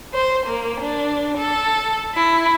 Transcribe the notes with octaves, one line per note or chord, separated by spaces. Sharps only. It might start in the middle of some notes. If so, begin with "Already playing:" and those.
C5
A#3
D4
A4
E4